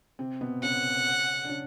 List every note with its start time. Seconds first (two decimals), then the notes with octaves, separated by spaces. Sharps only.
0.19 C3 C4
0.41 B2 B3
0.63 C#3 C#4 F#5
1.45 D4
1.49 C#3 C#4